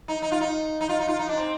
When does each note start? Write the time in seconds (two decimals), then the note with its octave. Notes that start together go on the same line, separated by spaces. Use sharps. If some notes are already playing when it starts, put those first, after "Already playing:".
0.08 D#4
0.22 D#4
0.32 F4
0.41 D#4
0.81 D#4
0.89 F4
1.00 D#4
1.08 F4
1.19 D#4
1.29 D4
1.37 C4